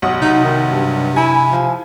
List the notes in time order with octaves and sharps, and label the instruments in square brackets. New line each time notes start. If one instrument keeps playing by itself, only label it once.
[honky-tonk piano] B1 F#5 D#6
[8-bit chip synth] C3 [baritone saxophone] D#4
[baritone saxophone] D#3
G2
[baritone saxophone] E4 [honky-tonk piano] G#5
[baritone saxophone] F3